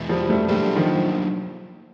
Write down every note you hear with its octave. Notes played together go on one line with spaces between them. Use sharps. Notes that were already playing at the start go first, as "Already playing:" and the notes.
Already playing: E2 B2 G#3 B3 E4
F3 G3
G3 A3
F#3 G3 A3 A#3 D4 G4 C5
D#3 F3